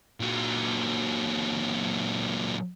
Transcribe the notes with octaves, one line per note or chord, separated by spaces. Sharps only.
A#2 F#3